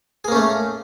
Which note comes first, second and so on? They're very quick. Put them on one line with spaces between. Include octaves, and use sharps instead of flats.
G#4 A#3 C#4 A3